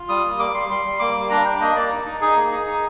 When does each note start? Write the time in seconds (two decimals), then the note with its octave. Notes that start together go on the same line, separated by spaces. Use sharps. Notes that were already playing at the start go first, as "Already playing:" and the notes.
Already playing: F4
0.09 G3 D#6
0.24 A#3
0.39 G3 D6
0.54 G3 C6
0.69 G3 C6
0.85 G3
0.99 A#3 D6
1.15 G3
1.30 D4 A#5
1.45 D4 G5
1.61 A#3 D#5
1.75 A#3 D5
1.91 D#4
2.06 D#4
2.21 D#4 G#4
2.36 A#3
2.51 D#4
2.67 D#4